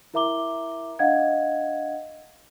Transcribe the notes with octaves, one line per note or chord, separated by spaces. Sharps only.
E4 A#4 E5 A#5 D6 G7
D4 D#5 F5 F#5 G#6